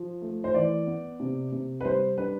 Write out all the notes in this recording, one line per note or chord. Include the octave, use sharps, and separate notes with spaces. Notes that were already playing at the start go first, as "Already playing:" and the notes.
Already playing: F3
A3
C5
E3 D5
B3
C3
C3
B4
G3 C5
D4 B4